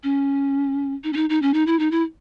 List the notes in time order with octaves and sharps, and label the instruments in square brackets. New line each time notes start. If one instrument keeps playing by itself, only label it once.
[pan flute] C#4
D#4
C#4
D#4
D#4
C#4
D#4
E4
D#4
E4